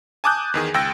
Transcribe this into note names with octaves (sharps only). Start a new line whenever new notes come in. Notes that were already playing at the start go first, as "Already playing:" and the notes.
G#5 A5 D6 D#6 F#6 G6
E2 D#3 G#4
C#2 G5 E6 A#6